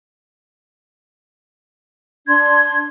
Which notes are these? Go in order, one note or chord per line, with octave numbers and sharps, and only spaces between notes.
D4 C6 G#6